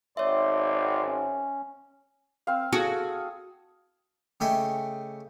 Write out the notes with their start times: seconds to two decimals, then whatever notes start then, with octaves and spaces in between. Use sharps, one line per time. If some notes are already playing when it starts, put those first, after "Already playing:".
0.17 G#1 C#5 D5 E5 C6
1.04 C#4
2.47 C4 F5
2.73 F#4 G#4 A4
4.40 C#3 A3 G4 D#5 G5 G#5